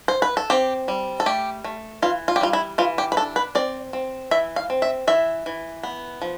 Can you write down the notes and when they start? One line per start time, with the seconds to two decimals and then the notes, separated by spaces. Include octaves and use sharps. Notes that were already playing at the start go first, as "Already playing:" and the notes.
0.08 C5
0.22 B4
0.37 A4
0.50 C4 G4
0.88 G3
1.20 A4
1.26 A3 G4
1.64 A3
2.02 E3 F4
2.28 F4
2.36 G4
2.41 G3 F4
2.53 E4
2.78 E3 F4
2.98 G4
3.12 B4
3.17 D4 A4
3.36 B4
3.55 C4 D5
3.93 C4
4.31 E3 E5
4.56 F5
4.70 C4
4.82 E5
5.07 E3 E5
5.46 E3
5.83 B3
6.22 F3